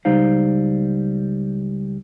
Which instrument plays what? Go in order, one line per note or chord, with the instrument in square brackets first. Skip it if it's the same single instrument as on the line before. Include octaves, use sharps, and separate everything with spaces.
[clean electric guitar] C#2 G3 D#4 C5 F5